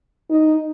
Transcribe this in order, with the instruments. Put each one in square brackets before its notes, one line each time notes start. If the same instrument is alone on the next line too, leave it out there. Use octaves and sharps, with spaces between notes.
[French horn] D#4